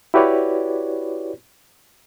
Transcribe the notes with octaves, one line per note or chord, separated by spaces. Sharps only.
E4 F#4 G4 B4 C#5 D5